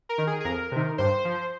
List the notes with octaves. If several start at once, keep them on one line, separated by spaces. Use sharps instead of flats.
A#4
D#3
G#4
G#4
F2 A#4
C3 D#3
G2 C5
F3